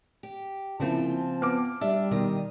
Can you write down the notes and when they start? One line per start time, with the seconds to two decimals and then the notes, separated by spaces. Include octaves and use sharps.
0.23 G4
0.80 C#3 F3 A#3 C4 E4 F4 G#5 A5
1.42 B3 D6 F6
1.81 G3 D4 E5
2.11 B2 D#3 D#5